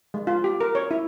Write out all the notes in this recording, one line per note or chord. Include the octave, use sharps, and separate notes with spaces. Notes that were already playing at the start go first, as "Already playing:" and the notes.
G#3
F4
G4
A#4
C#5
E4